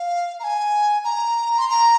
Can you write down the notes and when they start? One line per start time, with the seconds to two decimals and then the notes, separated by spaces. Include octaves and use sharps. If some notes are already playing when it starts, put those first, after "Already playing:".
Already playing: F5
0.40 A#5
0.44 G#5
1.04 A#5
1.58 C6
1.69 A#5